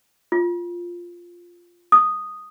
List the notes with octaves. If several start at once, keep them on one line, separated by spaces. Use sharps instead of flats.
F4
D#6